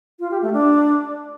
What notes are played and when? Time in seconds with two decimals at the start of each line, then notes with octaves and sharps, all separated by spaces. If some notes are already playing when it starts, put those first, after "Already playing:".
0.20 F4
0.31 G4
0.42 A3
0.53 D4